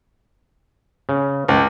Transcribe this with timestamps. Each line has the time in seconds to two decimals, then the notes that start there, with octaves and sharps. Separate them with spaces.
1.09 C#3
1.48 C#2